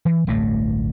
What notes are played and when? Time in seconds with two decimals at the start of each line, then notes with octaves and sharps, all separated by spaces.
0.05 E3
0.27 D1 A1 G2 A3